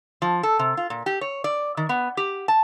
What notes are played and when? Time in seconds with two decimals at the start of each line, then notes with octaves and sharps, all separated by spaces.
0.22 F3
0.43 A4
0.59 C3
0.77 F4
0.90 A#2
1.06 G4
1.21 C#5
1.44 D5
1.77 D#3
1.89 B3
2.17 G4
2.48 A5